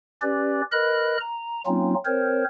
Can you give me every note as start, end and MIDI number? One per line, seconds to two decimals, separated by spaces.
0.22 0.61 61
0.22 0.61 67
0.22 0.61 71
0.22 0.61 74
0.72 1.17 70
0.72 1.17 71
0.72 1.17 75
0.72 1.17 83
0.72 1.17 90
1.20 1.61 82
1.66 1.94 54
1.66 1.94 58
1.66 1.94 60
1.66 1.94 61
1.66 1.94 63
1.66 1.94 65
2.05 2.44 60
2.05 2.44 70
2.05 2.44 72
2.05 2.44 73